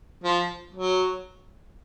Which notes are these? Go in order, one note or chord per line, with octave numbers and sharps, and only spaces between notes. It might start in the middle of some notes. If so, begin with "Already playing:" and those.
F3
F#3